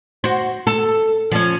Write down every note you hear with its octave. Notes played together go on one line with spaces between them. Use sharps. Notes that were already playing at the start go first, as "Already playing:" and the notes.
F#4 C5
A4
F3 C#4